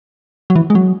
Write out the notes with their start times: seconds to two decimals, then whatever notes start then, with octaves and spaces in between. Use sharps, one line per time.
0.50 F#3
0.56 E3
0.70 G#3
0.75 F#3